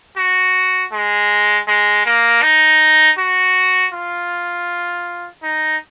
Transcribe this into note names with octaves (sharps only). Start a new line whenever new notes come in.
F#4
G#3
G#3
A#3
D#4
F#4
F4
D#4